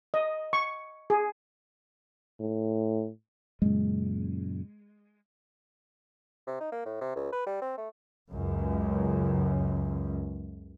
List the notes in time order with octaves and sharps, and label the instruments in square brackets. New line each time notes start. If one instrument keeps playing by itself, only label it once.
[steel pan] D#5
C#6
G#4
[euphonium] A2
[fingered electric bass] F#2 A#2 C#3 [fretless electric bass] G#3
[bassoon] C3
D#4
A#3
A2
C3
C#2
B4
G3
C4
A3
[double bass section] C#2 F#2